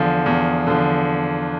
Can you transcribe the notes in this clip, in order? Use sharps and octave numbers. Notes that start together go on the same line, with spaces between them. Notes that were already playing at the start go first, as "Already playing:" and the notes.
Already playing: E2 D3 F3
E2
D3 F3